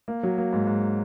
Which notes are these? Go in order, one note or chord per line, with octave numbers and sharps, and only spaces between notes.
A#3
F#3
A#3
G#2
G#2